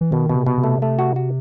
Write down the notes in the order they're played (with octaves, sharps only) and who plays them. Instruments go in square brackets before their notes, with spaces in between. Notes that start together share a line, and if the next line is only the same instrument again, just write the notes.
[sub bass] E3
[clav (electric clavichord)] B2 [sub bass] D#3
[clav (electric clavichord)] B2
[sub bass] C3
[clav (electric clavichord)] B2
[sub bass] C3
[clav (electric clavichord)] A3
A3
F#4
F#4